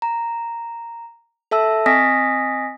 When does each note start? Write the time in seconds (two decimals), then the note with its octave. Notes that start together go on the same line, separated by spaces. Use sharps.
0.02 A#5
1.51 A4 E5 A5 E6
1.86 C4 D#5 G#5 D#6 A#6 B6